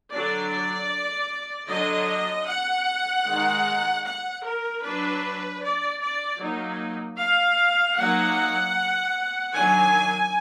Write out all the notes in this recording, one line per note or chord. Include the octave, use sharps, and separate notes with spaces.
D3 F#3 D4 D5
D3 F#3 D4 D#5
F#5
D#3 G#3 D#4
F#5
A#4
F#3 D4 B4
D5
D5
F#3 A#3 D#4
F5
F#3 A#3 D#4 F#5
D#3 F#3 D4 G#5